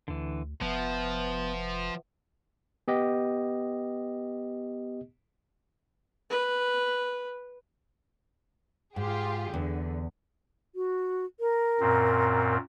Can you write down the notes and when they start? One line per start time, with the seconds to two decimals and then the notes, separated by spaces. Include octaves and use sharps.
0.08 D2 D3 E3
0.62 F1 F3 B3 B4 E5 F#5
2.88 B3 G4 D#5
6.30 B4
8.96 G#2 F4 G4 G#4
9.54 E2 D3
10.75 F#4
11.40 A#4
11.80 F#2 A#2 C4